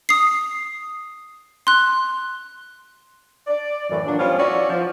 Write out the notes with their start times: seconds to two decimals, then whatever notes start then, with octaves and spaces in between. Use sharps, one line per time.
0.09 D#6 C7
1.67 C6 F#6
3.47 D5
3.90 F#2 A2 E3
4.05 A#2 F#3 D4
4.18 F3 G3 B3 C#4 F4
4.38 C#4 E4 F#4 D5
4.69 F3